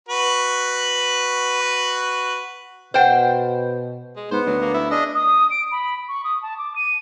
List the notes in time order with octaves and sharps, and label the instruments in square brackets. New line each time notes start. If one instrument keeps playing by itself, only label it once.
[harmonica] F#4 B4
[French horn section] B2 [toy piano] B4 D#5 F#5 [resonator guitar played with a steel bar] C5 G5
[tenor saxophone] G#3
[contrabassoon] G#2 [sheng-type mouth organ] B3 [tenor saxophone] C5
[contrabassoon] D2 [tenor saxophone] F#3
[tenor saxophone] A#3
E4
[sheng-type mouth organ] D4 D#5 [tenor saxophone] G#4
[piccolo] D#6
D7
B5
C#6
D#6
A5
D6
D#7